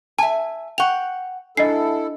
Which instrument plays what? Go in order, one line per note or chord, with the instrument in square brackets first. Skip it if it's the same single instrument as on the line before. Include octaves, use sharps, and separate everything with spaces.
[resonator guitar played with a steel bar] E5 G#5 [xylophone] A5
[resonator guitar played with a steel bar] F#5 G5 [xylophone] C#6 F7
[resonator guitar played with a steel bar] G#2 [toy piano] D4 D#5 [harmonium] E4 A4 [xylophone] C7